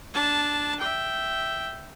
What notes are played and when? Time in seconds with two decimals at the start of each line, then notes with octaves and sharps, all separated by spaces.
0.14 D4 A5
0.80 E5 G5